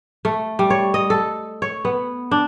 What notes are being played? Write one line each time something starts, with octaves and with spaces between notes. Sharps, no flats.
A3
G3
C#5
D#5
A4
C#5
B3
D4